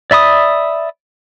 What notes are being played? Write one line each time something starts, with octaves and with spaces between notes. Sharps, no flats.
D5 E5 B5 D#6